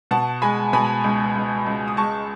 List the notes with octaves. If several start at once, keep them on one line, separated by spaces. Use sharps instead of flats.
B2 F#5 A5
G#3 G#5 B5
B2 G#5 B5
C#2
C#2
C#2
D#6
G#3 A5 C#6